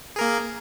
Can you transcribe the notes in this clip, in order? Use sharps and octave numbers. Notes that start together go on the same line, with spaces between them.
A#3 G#4 A#4